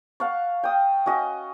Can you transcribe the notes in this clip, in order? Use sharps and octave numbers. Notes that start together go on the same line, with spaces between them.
F5 F#5 A5 C#6
G5 D#6
C#4 F#4 D#5